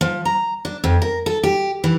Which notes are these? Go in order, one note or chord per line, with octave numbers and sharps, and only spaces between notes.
F3
A#5
D4
F2
A#4
A4
G4
E3